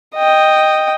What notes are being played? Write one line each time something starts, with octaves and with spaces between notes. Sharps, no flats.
D#5 G5